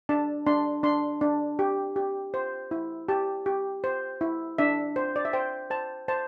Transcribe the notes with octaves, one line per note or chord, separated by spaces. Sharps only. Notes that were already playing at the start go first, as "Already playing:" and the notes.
D4 A5
D4 C6
D4 C6
D4
G4
G4
C5
E4
G4 A5
G4
C5
E4
D4 E5
C5
D5
E5
C5 G5
C5 A5
C5 A5